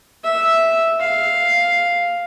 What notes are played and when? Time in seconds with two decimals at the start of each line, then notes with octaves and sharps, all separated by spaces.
0.24 E5
1.00 F5